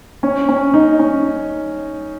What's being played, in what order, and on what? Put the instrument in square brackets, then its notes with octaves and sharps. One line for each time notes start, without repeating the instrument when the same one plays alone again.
[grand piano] C#4
C#4
D#4
C#4